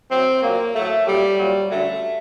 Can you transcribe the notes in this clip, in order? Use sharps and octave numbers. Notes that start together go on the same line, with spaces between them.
A2 F#3 C4
A#2 F#3 A#3
A2 F#3 A3
A#2 F#3 G3
A#2 F#3
F#2 D3 F#3 A3